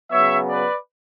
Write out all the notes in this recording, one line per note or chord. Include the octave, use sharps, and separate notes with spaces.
C#3 F#3 B3 C#5 E5
B4 D5